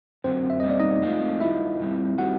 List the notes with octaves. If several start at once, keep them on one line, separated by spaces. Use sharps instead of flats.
F#2 D3 F#3 C4 C5
E5
B2 G3 A#3 C#4 D#5
D5
D#4 D#5
A2 F3 G#3 C4 F4
G2 D#3 E4 F4 E5
A#2 G3 C4
D#3 G3 C4 F#4 F#5